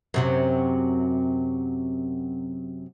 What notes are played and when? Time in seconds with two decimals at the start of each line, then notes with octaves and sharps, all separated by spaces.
0.14 F#2 C3 F#3